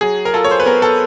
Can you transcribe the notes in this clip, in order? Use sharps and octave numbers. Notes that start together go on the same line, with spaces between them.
F#3 G#4
A#4
F4 A4
C#5
C5
B4
B3 A#4
A4